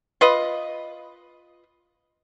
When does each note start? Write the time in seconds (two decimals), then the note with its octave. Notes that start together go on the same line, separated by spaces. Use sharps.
0.21 F4 B4 D#5